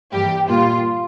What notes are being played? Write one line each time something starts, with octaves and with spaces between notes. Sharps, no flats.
G2 E3 G3 A#3 G4
A#2 G3 A#3 F4